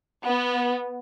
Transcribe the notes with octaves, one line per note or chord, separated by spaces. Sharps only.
B3